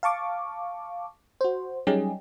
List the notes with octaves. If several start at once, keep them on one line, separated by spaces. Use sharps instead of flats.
F5 A5 C#6 D6
F#4 C5
F#3 G3 C#4 D#4 G4 G#4